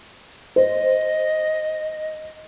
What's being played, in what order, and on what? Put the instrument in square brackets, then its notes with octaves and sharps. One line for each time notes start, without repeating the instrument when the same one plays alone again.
[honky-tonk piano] C5 [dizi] D#5